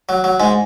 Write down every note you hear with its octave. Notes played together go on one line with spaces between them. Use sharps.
F#3
F#3
G#2 G#3